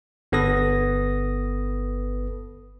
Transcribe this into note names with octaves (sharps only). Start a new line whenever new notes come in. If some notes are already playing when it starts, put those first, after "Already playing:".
G1 B3 A4 B4 D#6 A#6